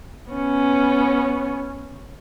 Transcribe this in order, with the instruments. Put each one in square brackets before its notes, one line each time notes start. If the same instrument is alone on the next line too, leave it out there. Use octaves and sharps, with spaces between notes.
[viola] B3 C#4